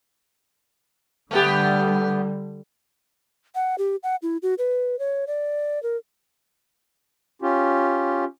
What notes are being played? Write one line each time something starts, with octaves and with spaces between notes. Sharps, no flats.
D3 G3 A3 B3 G4
F#5
G4
F#5
E4
F#4
B4
C#5
D5
A#4
C#4 F4 G4